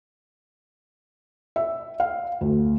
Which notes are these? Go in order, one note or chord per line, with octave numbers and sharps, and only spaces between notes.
E5
F5
D2